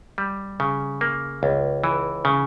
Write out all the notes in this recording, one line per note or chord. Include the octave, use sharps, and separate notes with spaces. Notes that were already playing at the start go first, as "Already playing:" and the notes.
G3
C#3
A#3
C#2
E3
C#3